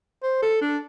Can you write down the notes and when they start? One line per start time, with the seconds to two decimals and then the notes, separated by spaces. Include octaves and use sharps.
0.23 C5
0.42 A4
0.61 D4